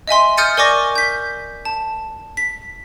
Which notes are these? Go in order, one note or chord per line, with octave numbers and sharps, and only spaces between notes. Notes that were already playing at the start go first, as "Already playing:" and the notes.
D#5 E5 G#5 C6
D#6 F6 G6 A6 C#7 D#7
A#4 D5 G#5 C#6 D6 A#6
G6 B6
A5
B6